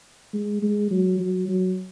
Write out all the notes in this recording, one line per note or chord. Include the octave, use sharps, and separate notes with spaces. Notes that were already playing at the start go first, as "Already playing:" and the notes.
G#3
G#3
F#3
F#3
F#3